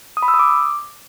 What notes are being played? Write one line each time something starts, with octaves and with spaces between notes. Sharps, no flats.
D#6
B5
E6
D#6
D6